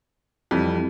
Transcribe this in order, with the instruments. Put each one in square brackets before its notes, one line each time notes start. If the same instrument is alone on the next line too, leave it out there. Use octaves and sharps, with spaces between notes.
[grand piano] F2 E3 G3